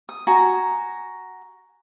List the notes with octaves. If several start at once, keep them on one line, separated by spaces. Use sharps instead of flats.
D#6
F#4 G#5 A#5